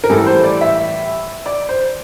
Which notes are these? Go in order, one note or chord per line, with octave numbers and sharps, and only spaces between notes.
A#4
A2 E3 G3 A4
C5
D5
E5
D5
C5